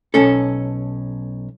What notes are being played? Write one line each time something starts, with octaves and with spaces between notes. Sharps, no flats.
B1 C#4 A4